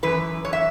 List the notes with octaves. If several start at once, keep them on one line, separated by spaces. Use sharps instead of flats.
F#2 E3 B4
C#5
E5